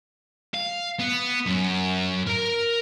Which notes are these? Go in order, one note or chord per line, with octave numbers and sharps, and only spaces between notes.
F5
B3
F#2
A#4 A#5